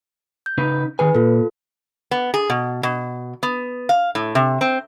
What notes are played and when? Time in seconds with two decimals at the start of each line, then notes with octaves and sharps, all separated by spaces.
0.46 G6
0.58 C#3 D#4 B4
0.99 D#3 G#4 B4 G#5
1.15 A#2 F4 A4
2.11 B3
2.34 G#4
2.50 B2
2.83 B2
3.43 B3
3.89 F5
4.15 A2
4.35 C3
4.61 C4